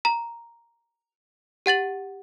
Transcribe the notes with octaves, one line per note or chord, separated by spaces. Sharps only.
A#5
G4 F#5 A6 F#7